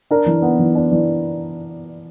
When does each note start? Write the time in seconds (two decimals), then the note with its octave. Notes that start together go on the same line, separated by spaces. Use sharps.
0.11 D4 A#4
0.26 E3
0.42 B3
0.59 E3
0.75 D4
0.92 E3